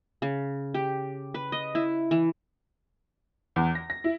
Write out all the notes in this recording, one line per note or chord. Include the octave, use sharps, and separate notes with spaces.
C#3
G4
B4
D#5
E4
E3
E2
A#6
A#6
E4